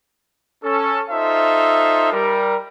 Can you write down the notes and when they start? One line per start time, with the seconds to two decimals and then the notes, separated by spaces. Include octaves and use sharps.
0.64 C#4 A4
1.10 D#4 F4 A4 C5 E5
2.12 G3 A#4